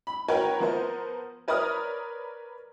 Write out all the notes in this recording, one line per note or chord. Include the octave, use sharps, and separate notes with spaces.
B5
F#4 A#4 B4 C#5 G5
F3 B3 A#4 C5
A#4 B4 C#5 D5 D#6 F6